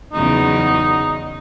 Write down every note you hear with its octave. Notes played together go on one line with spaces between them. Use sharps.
E2 C#3 F#3 D#4